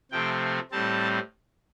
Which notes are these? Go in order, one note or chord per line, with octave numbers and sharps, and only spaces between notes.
C3 F3 A3 C4 G5
A2 G3 C4 A5